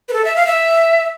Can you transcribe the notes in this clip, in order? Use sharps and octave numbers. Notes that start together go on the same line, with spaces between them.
B4
A4
E5
F5
E5